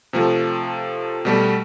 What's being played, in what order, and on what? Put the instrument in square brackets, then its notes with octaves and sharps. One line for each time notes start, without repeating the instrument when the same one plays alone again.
[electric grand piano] C3 F3 A3
B2 G3 A3